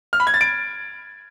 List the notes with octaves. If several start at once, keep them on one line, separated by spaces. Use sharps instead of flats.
F6
B5
G#6
A6
D7